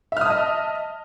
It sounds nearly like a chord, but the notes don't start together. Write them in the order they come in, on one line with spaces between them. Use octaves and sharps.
E5 F6 D#6 A5 D#5